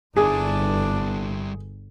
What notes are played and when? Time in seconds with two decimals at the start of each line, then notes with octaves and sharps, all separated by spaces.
0.17 G1 G3 D4 E4 G#4